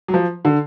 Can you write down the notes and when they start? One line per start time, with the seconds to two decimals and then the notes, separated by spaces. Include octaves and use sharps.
0.08 F#3
0.14 F3
0.45 D3